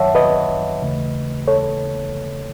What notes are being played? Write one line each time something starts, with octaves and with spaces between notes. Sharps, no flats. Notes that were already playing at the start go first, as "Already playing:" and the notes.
Already playing: F#2 D#3 F#3 C#5 E5 F#5 A5
B4 D#5
D#2 C#3 E3 A3
A4 C#5